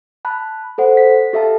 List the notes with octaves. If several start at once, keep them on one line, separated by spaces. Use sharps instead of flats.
A5 B5 F#6
A4 C5 F#5
B6
G4 A4 E5 F5 A5